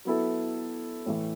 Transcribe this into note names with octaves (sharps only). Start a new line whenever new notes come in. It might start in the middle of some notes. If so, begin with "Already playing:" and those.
F#3 B3 E4 A4
A2 E3 A3